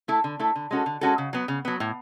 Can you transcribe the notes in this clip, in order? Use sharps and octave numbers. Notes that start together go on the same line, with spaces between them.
A3 E4 A4
D3
A3 E4 A4
D3
G#3 C#4 F#4 A4
D3
G#3 C#4 F#4 A4
C#3
F#3 B3
C#3
F#3 B3
A2